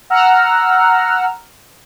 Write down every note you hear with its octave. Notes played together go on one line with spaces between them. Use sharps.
F#5 A#5 E6 F6